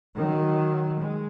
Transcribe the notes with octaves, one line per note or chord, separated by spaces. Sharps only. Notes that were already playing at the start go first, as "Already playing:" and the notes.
D#3 F#3
G#3